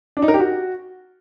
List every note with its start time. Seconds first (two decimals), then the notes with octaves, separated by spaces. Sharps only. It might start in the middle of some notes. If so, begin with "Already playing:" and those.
0.17 D4
0.22 D#4
0.28 A#4
0.34 G4
0.40 F#4